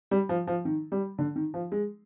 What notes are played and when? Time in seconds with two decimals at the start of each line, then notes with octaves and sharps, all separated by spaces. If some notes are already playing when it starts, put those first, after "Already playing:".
0.11 G3
0.29 F3
0.47 F3
0.65 D#3
0.92 G3
1.18 D3
1.36 D#3
1.54 F3
1.72 G#3